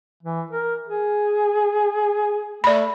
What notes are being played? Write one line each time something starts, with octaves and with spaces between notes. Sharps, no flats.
E3
A#4
G#4
A3 D5 B5